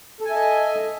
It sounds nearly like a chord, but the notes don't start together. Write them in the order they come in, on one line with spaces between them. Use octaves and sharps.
A4 G#5 E5 D#5